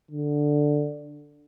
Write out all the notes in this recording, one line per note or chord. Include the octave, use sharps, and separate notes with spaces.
D3